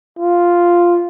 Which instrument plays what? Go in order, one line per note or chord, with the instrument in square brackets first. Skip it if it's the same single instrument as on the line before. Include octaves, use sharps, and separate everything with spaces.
[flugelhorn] F4